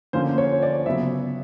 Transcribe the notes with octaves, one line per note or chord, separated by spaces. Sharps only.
D3 F3 A#3 C#4 C5
C#5
D5
C#3 F#3 B3 E5